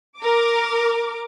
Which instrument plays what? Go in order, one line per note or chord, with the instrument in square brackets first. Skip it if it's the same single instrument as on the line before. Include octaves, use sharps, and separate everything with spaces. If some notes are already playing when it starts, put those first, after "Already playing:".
[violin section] A#4 D6